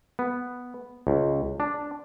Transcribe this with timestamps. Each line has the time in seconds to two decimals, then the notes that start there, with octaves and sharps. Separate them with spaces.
0.19 B3
1.07 C#2
1.60 D4